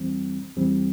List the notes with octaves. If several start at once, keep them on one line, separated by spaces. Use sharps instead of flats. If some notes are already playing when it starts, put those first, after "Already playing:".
Already playing: E2 E3 G3 C4
E2 E3 G3 C4